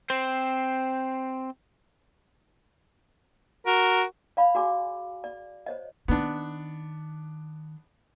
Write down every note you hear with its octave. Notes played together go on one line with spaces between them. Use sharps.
C4 C5
F#4 A#4
D5 F5 B5
F#4 G#4 D5 G#5 D6
D5
C5 C#5 D#5
D#3 B3 D4